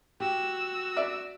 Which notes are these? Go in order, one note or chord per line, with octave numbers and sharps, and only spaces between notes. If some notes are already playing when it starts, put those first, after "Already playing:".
F#4 G4 E6
D5 E5